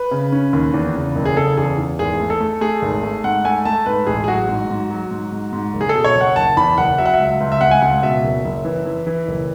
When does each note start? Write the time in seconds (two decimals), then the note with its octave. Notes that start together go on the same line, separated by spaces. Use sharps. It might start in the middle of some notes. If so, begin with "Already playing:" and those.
Already playing: B4
0.11 C#3
0.32 C#4
0.53 D#2
0.74 E2
0.95 C#3
1.15 F#1
1.25 G#4
1.36 C#3 A4
1.57 E2 G#4
1.78 E2
1.99 G#1 G#4
2.20 A3
2.30 A4
2.40 A3
2.61 A3 G#4
2.82 G#1
3.03 A3
3.24 G#2 F#5
3.45 A3 G#5
3.65 A3 A5
3.86 G#2 B4
4.07 A1 G#4
4.24 G#4
4.28 F#3 F#4
4.49 G#2
4.70 G#2
4.90 F#3
5.11 G#2
5.32 G#2
5.53 G#2
5.73 F#1
5.81 G#4
5.89 A4
5.94 B2
6.04 C#5
6.15 F#1
6.21 F#5
6.36 F#1 A5
6.57 E2 B5
6.78 F#1 F#5
6.98 F#3 E5
7.06 F#5
7.14 E5
7.20 C#2
7.40 C#2
7.52 E5
7.61 C#2 F#5
7.71 G#5
7.82 C#2 F#5
8.02 B2 E5
8.24 F#1
8.44 F#1
8.65 E3
8.86 E3
9.07 E3
9.28 F#1